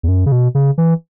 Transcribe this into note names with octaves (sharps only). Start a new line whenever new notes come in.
E2
F#2
C#3
B2
C#3
E3